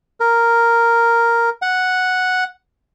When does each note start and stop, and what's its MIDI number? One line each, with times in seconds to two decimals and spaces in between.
0.20 1.50 70
1.62 2.44 78